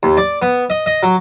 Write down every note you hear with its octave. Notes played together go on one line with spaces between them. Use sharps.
D#2
D5
B3
D#5
D#5
F#3